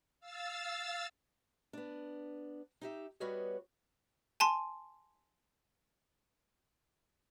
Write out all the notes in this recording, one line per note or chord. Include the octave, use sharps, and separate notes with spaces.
F5 E6 A6
B3 D4
D#4 G4 E5
G3 B3 F#4 B4 C#5 D#5
G#5 A5 C6